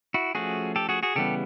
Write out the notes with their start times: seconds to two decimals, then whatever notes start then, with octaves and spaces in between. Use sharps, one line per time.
0.14 E4 F#4
0.35 F3 A3 C#4 F#4 G#4
0.76 G4 A4
0.89 F#4 G#4
1.03 F#4 G#4
1.16 C#3 E3 G3 B3 G4 A4